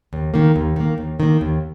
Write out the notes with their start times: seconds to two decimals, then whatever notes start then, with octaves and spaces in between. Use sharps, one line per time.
0.13 D#2
0.34 D#3 A#3
0.56 D#2
0.76 D#3 A#3
0.98 D#2
1.20 D#3 A#3
1.41 D#2